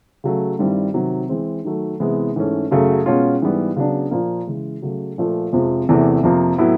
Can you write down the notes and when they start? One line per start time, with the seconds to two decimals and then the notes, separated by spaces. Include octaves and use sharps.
0.24 C#3 F#3 A3
0.59 G2 D#3 G3 C4 E4
0.94 C3 D#3 F#3
1.29 E3 G#3 C4
1.65 D#3 F#3 A3
2.00 C3 E3 G#3 B3 E4
2.36 G#2 E3 A3 C#4
2.71 F#2 C#3 F#3 A3
3.06 B2 G#3 C#4 F4
3.42 G#2 E3 G3 B3
3.77 C#3 F#3 B3 D4
4.11 A#2 F3 A#3
4.47 C#3 E3 G#3
4.82 C#3 F#3 A3
5.18 A#2 F3 A3
5.53 F2 C3 F3 G#3
5.89 E2 C3 E3 A3
6.23 F2 C3 F3 A#3
6.58 A2 F#3 B3 E4